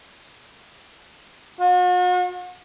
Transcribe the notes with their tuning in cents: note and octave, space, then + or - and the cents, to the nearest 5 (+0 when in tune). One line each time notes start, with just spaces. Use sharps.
F#4 -45